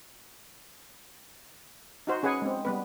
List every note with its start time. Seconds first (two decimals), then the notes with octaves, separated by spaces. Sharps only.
2.07 D#4 F#4 C5
2.23 C#4 G#4 B4 F#5 G#5
2.42 G#3 C4
2.65 G3 B3 B4